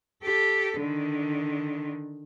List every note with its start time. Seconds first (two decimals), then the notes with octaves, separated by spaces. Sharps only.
0.23 G4 A4
0.79 D3 D#3